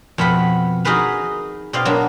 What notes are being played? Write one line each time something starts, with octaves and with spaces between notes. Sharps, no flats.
F2 B2 B4 F#5 B5
D#4 F#4 G#4 A#4 B4 F5
B2 C4 D5 D#5 F5
F#3 A#3 B3 D4